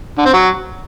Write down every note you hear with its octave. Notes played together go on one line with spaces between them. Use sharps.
D3
C4
F#3